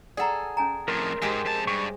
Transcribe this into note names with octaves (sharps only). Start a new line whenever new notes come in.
G#4 A4 D5 F#5 A#5
C#4 G#5 A#5
F2 A2 A#4 C6
G#2 G#3 G4 C5
F2 A5
G2 C#6